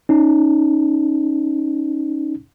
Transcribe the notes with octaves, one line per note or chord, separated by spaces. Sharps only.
C#4 D#4